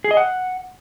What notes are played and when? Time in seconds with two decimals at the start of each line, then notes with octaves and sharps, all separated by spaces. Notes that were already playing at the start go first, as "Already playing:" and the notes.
0.04 G#4
0.11 D#5
0.17 F#5